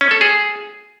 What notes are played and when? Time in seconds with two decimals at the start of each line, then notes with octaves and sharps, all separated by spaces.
0.01 C#4
0.11 A4
0.21 G#4